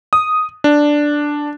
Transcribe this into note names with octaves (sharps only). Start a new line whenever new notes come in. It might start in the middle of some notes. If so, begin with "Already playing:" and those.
D#6
D4